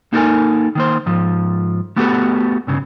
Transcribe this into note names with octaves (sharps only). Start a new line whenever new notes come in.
A#3 D#4 F#4 A4 A#4 G#5
D#3 A#3 C5
G#2 F3
A3 B3 F#4 G4 A4 B4
C2 G2 C#3